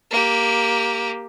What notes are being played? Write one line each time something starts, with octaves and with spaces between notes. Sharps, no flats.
A#3 G4